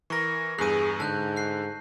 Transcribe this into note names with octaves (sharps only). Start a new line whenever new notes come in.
E3 A#4 C#6 A#6
E2 G2 G#4 F#6 D#7
G#2 D3 A5 F#6 G6
F#6 C7